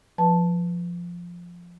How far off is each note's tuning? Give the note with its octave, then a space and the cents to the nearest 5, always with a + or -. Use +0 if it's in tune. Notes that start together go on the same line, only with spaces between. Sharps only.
F3 +0 B4 +0 A5 +0